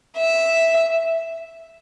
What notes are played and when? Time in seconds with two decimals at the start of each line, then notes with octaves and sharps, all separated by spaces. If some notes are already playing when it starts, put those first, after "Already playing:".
0.17 E5